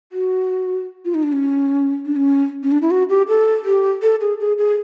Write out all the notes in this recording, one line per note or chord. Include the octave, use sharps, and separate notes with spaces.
F#4
F4
D#4
D4
C#4
D4
C#4
C#4
D4
E4
F#4
G4
A4
G4
A4
G#4
G#4
G#4